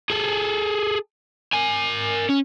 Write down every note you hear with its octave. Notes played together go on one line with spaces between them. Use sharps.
G#4 A4
A#4 G#5
C#4